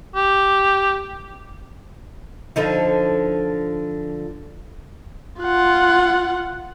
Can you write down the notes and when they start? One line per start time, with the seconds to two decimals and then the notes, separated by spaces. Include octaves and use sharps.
0.15 G4
2.56 D3 F3 D#4
5.41 F4 F#5